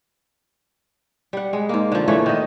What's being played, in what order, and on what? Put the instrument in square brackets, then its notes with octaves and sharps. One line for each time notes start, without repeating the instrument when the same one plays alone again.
[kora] G3 F#5
G#3
G#2 A#3
D3 F3
A#2 E3 A3 C#5
D#3 D#5